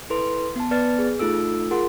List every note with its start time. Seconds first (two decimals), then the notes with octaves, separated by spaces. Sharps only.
0.10 E4 A4 B4 C6
0.56 B3 A5
0.71 B3 B4 D5 F6 A6
0.99 G#4
1.19 A3 D#4 F4 A4 E6
1.71 F4 G#4 A#4 F#5 C6